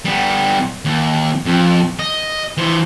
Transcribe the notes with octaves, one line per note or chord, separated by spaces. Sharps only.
G3 B3
D#2
F2
D#5
E3 C5